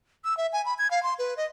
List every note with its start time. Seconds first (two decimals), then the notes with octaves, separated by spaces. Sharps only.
0.24 E6
0.37 E5
0.53 G#5
0.65 B5
0.79 G#6
0.91 F5
1.03 C6
1.19 B4
1.37 D#5